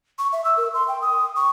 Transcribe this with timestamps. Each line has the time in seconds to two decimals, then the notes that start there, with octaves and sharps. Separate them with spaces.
0.19 C#6
0.33 E5
0.44 E6
0.57 A#4
0.74 C6
0.88 G5
1.02 D#6
1.36 C#6